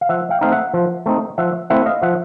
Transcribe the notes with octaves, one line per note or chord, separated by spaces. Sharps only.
F5
F3 E5 F#5
F5 G5
A3 C4 D#4 F5
E5 F#5
F3
A3 C4 D#4
F3 E5 F#5
A3 C4 E4 E5 F#5
D#5 F5
F3 E5 F#5